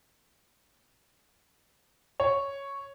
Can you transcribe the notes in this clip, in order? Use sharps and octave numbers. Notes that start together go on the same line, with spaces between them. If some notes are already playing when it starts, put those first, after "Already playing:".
C#5